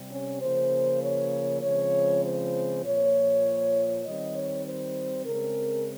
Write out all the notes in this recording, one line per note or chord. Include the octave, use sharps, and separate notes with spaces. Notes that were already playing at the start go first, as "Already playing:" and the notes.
Already playing: C3 G3
C#4
C#3 F3 A#3 C5
C#5
C#3 F3 G#3 C4 C#5
C5
A#2 F3 A#3 C#5
D#3 G3 C4 D#5
C#5
C5
C#3 G#3 C4 A#4